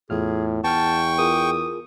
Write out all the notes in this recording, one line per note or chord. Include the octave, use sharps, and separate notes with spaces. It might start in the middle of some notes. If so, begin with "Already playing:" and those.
E2 A2 F4 G#4 F6
E2 B3 G5 A5 C#6 F6
F4 G#4 A#4 D#6